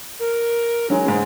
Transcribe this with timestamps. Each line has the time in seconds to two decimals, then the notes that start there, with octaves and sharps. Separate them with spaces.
0.20 A#4
0.90 F#3 G#3 D#4
1.06 G#2 G#3